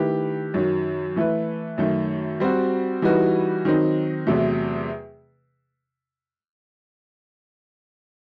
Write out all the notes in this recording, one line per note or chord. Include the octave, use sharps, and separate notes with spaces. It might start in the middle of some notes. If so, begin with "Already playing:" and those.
Already playing: D#3 A3 E4 G4 B4
F#2 D#3 F#3
E3 A3 E4 B4
F#2 D#3 A3
G3 C4 F#4
E3 G3 D#4 F#4 B4
D#3 F#3 C4 D#4
E2 C3 F#3 A3